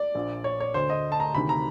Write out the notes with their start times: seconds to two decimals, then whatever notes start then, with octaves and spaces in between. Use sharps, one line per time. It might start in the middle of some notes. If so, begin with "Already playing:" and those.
Already playing: D5
0.15 A#1 A#2
0.44 C#5
0.60 C#5
0.74 D2 D3 C5
0.90 D#5
1.12 A5
1.20 A#5
1.35 D2 C3 D#3 B5
1.49 A#5